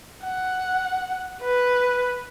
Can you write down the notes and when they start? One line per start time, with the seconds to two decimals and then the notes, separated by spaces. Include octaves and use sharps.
0.25 F#5
1.42 B4